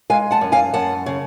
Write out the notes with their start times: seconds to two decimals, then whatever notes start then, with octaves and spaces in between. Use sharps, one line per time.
0.10 G#3 F5 G#5
0.31 F#5 A5
0.41 F#2
0.52 F5 G#5
0.74 F#2 F#5 A5
1.06 C#3